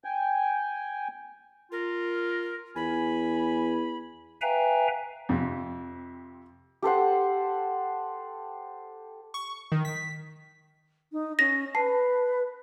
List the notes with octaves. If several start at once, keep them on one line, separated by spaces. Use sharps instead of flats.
G5 G#5
F4 A#4
E2 G#5 B5
B4 E5 F5 G5 G#5 A#5
F2 C3
G4 A4 C5 F#5
C#6
D#3
B6
D#4
C#4 A#6
B4 A5 C7